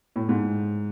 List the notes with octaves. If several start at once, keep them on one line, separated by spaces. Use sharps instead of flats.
A2
G#2